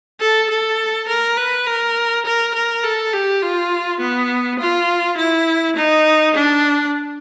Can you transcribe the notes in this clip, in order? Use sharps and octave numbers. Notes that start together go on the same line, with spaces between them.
A4
A4
A#4
B4
A#4
A#4
A#4
A4
G4
F4
B3
F4
E4
D#4
D4